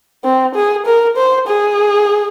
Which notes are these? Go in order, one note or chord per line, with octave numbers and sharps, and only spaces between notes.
C4
G#4
A#4
C5
G#4